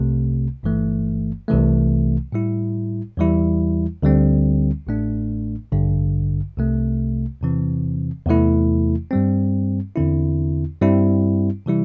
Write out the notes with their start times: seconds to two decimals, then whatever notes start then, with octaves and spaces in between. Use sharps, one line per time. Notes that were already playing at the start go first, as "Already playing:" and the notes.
Already playing: C2 C3 A3
0.63 G1 G2 E3 A3
1.48 C2 C3 E3 A3
2.32 A2 G3 E4
3.17 E2 E3 G3 E4
4.03 D2 D3 G3 C4
4.87 A1 A2 A3 D4
5.72 A1 G2 D3
6.57 C2 C3 A3
7.41 E2 C3 E3 C4
8.26 E2 C3 E3 A3 E4
9.11 G2 G3 C4
9.96 E2 D3 C4 E4
10.81 G2 G3 C4 E4
11.66 C3 E3 G3 E4